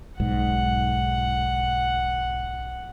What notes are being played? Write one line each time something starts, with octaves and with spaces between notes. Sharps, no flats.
B1 G#2 F#5